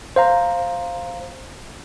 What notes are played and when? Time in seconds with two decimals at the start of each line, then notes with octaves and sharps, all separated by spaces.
0.16 C5 F5 A#5